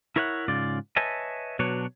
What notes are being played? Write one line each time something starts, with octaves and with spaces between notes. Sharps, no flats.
E4 A#4 C#5 E5 F#5
G#2 C#3 F4 D5
B4 C#5 D#5 E5 G#5 A5
B2 F#3 D4 B4 C#5